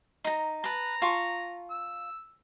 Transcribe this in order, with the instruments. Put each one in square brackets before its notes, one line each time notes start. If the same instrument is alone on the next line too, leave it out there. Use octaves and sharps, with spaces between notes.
[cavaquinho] D#4 A#5
[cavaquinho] B4 A5 [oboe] A#5
[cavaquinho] F4 A5 C#6
[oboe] E6